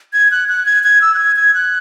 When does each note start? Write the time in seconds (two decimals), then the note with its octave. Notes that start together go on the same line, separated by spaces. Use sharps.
0.13 G#6
0.31 F#6
0.49 F#6
0.66 G#6
0.84 G#6
1.02 E6
1.14 F#6
1.19 G#6
1.36 G#6
1.54 F#6